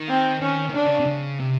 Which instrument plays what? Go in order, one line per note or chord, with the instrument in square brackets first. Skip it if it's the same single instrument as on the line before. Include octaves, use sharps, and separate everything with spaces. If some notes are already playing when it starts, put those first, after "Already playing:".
Already playing: [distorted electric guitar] D#3
[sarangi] C4
[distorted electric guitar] D#3 [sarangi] C#4
[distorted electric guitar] D#3
[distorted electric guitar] D3 [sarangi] D4
[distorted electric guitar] C#3
C3
C#3
C3